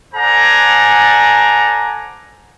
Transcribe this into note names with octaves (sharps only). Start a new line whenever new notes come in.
A4 C5 D5 F#5 G#5 A#5